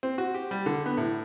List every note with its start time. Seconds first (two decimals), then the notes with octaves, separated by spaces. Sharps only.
0.03 C4
0.18 F#4
0.34 G4
0.51 G3
0.66 D3
0.86 B3
0.97 A2